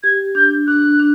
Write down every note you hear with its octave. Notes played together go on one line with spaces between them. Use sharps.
G4 G#6
D4 G6
D4 F#6
D4